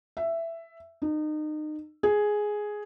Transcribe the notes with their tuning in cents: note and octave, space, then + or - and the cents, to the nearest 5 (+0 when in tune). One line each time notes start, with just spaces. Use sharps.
E5 +10
D#4 -30
G#4 +5